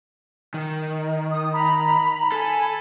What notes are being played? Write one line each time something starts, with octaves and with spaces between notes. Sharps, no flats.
D#3
D#6
A#5 B5
A4 G#5 B5